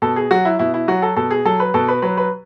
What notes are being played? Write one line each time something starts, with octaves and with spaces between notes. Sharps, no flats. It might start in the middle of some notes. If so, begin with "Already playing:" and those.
B2 A4
G#4
F#3 F#4
E4
B2 E4
E4
F#3 F#4
A4
B2 A4
G#4
F#3 A4
B4
B2 A4
B4
F#3 B4
B4